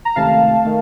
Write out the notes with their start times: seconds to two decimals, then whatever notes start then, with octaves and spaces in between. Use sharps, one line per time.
0.05 A#5
0.16 C#2 C3 D#3 A3 F5 A5
0.65 D#3 A3